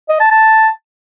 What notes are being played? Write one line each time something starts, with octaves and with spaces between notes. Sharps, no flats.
D#5
A5
A5